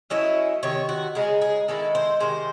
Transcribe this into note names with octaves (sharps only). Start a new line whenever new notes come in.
F#3 A3 C#4 E4 D#5
C3 D#3 C#5
F#4
C#3 G#3 D#4 G#4
G#4
D#3 G#3 C#4 E4 A4
C5
C3 D#3 G#3 C5